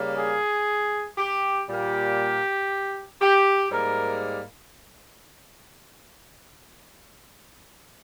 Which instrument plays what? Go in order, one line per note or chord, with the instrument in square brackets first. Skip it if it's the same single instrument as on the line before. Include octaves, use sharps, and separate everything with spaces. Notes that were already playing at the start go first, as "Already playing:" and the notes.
Already playing: [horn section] C#3 G3 A#3
G#4
G4
A#2 G3 A#3 G4
G4
G#2 G3 A#3 A#4